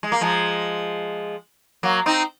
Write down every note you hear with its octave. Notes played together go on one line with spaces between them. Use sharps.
G#3
A#3
F3 G#3
F#3 A#3
C4 D#4